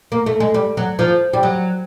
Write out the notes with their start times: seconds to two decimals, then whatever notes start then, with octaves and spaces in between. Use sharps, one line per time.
0.12 A#3
0.26 A3
0.40 G#3
0.54 G3
0.77 F#3
0.99 F3
1.33 G3
1.43 F#3